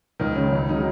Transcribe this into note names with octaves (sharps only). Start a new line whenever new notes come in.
C#2 D#3
C#3 G#3 C#4
C#2
C#3 F#3 D#4